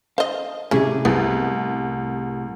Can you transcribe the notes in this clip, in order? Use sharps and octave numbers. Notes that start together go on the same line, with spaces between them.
C5 D#5 F5
A2 C3 G3 C#4 E4 G#4 G#5
C2 B3